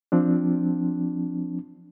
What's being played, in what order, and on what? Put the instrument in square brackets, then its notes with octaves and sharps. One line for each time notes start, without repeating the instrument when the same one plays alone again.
[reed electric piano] F3 C4 D4